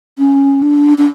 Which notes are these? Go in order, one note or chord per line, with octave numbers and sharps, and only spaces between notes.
C#4
D4
D4